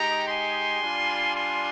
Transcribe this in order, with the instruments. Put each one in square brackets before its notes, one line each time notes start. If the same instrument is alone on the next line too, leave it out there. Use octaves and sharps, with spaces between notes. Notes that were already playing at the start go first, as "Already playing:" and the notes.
Already playing: [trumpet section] G#3 D#4 G4 G5 A#5
G#5 C6
G3 D4 F4
G#5 C6